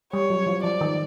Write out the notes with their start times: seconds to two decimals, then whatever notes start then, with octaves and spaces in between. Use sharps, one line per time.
0.13 G3 C#5
0.30 F#3
0.46 F3
0.64 F3 D5
0.81 D#3